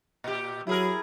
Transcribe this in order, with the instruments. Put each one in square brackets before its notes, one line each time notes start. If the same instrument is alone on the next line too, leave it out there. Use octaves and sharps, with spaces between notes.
[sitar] A#2 G4
[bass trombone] F#3 [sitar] E4 G#4 A#4